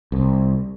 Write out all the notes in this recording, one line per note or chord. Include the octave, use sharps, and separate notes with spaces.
C2